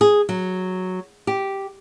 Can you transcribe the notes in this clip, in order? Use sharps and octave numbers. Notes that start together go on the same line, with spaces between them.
G#4
F#3
G4